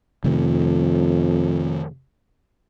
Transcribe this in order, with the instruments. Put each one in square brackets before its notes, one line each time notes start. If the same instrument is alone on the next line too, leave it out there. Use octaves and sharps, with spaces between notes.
[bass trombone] F2 [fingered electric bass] C3 D#3 A3